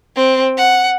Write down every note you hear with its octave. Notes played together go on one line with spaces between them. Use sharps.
C4
F#5